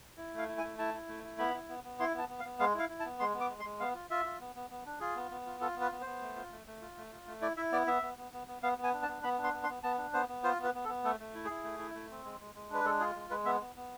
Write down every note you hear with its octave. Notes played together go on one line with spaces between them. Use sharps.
E4
A3 F5
E4
G#5
A3
E4 A5
E4
A3
E4
B3 B5
E4
B3
B3
E4 C6
B3 A5
B3
F5
B3
G#3 F5
E4 F5
E4
A5
B3
G#3 C6
B3
D6
G#3
C6
G#3
B3 F5
F4
F4 E5
F4
B3
B3
B3
D4
F4 G#4
B3
B3
F4
F4 A4
B3 B4
B3
B3 C5
A3
F4
A3
A3
F4
A3
F4
A3
E4 D5
E4 E5
B3 D5
B3 E5
B3
B3
B3
B3
B3 F5
B3
G#5
D4
A5
B3
B3 B5
D4
C6
B3
C6
B3
B3 A5
D4
B3 C5
B3
F4 C5
B3 B4
B3
A4
B3
A3 A4
A3
E4
G#4
E4
A3
E4
A3
C4
G#3
G#3
G#3
D4 B4
G#3 A4
F4 G#4
G#3
G#3 B4
B3 E5
B3
B3